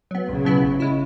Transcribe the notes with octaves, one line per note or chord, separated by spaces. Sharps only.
F#3 B3
B1 C#3
B2 F#3 B3 E4
G#1
C#3 G#3 E4